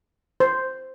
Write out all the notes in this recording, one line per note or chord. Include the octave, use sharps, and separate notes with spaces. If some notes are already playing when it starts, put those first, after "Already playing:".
C5